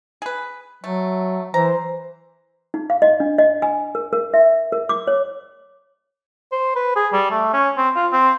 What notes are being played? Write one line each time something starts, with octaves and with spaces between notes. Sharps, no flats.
G#4 B4
F#3 A3
E3 C5 A#5
D#4
F5
D#5
D4
D#5
G#5
A#4
A#4
E5
A#4
D6
C#5
C5
B4
G#4
G3
A3
C#4
C4
F4
C4